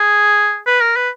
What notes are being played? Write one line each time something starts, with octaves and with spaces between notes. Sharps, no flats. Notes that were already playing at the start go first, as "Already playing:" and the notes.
Already playing: G#4
B4
A#4
B4